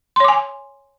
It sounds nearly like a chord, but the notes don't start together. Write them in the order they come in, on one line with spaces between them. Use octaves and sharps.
C6 C#5 D6 G#5